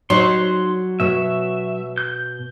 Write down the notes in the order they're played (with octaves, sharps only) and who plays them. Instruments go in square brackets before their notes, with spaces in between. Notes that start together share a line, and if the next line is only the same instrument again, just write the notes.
[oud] F#3 [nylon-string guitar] D#4 [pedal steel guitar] C6
[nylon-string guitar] B2 F#4 C#5 [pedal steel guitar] E5
[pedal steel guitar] G6